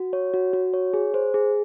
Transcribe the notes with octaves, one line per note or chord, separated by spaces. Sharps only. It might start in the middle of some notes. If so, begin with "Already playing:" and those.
Already playing: F#4
C#5
F#4
F#4
C#5
G#4
C5
G#4